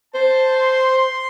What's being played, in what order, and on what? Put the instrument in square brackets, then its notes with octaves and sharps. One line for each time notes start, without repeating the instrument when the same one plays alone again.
[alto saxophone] C5 [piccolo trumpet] A5
[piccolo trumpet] C6
C6